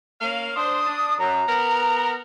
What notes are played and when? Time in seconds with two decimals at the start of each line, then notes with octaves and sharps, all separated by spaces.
0.21 A#3 C#4 F5
0.56 D4 C5 D#6
0.87 D4
1.19 F#2 A#5
1.47 B3 A#4